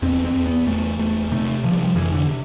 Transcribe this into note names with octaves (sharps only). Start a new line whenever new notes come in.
E2 C4
C4
E2
B3
E2 A3
E2 A3
C3 A3
C3 F3
G3
F3
F2 E3
D3